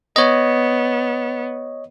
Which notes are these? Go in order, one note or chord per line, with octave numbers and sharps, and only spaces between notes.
B3 C#5 D#5